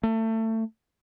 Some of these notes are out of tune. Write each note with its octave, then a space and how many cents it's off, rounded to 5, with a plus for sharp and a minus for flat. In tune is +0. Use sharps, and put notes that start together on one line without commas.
A3 +25